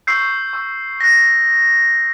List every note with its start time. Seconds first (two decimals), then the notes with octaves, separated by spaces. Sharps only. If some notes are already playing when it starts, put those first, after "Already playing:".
0.07 C#6 E6 G6 C7
0.53 C#6 E6 G6
1.01 D#6 F#6 A#6